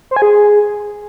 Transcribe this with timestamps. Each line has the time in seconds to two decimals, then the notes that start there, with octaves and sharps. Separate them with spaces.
0.11 C5
0.16 G#5
0.22 G#4